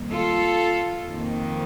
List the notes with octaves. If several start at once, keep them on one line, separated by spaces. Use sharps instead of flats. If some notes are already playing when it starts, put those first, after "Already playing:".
Already playing: F2 D#3 G3 A#3
F4 A4
F2 D#3 A#3